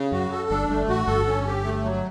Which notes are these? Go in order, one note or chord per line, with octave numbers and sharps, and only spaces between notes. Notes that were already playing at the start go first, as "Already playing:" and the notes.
Already playing: C#3
F#2 F#4
A4
G1 G2 D4
G1 G2 A3
A1 A2 F#4
G1 G2 A4
C#4
G4
A3
F#3